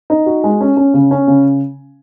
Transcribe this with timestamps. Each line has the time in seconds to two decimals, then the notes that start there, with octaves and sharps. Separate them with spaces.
0.10 D#4
0.26 F#4
0.44 G#3
0.61 C#4
0.77 C#4
0.94 C#3
1.11 C#4
1.27 C#3